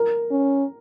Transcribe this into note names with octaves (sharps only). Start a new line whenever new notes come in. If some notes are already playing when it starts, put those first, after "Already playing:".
Already playing: A#4
C#4